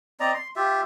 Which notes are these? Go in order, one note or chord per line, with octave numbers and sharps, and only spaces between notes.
C4 D5 D#5 A#5
C6
F4 G4 E5